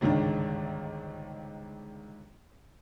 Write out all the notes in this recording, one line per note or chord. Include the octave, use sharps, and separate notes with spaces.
G1 C#2 G#2 D#3 D4